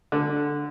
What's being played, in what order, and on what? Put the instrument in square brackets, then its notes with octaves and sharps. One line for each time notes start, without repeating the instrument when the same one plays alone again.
[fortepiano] D3